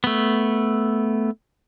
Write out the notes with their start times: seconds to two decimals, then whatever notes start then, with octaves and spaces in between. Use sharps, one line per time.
0.04 A3 B3